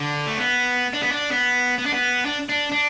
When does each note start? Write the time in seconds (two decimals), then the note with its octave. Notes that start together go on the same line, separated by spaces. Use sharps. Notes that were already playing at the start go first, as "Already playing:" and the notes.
Already playing: D3
0.27 A3
0.37 B3
0.93 D4
1.02 B3
1.11 D4
1.31 B3
1.78 B3
1.86 D4
1.93 B3
2.25 D4
2.49 D4
2.72 D4